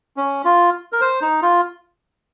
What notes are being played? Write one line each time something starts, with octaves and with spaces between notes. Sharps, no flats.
C#4
F4
A#4
C5
D#4
F4